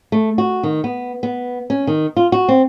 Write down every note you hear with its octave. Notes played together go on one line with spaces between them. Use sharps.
A3
F#4
D#3
B3
B3
C#4
D#3
F4
F#4
C4